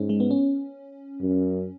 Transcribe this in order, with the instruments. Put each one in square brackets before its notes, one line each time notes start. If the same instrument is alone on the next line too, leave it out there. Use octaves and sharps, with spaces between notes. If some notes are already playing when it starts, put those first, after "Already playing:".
Already playing: [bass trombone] G#2 [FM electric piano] C#4
[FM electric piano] G#3
B3
C#4
[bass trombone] F#2